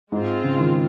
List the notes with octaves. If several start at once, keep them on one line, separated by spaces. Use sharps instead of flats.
G#2 G#3 C4 F4
C#3
D#3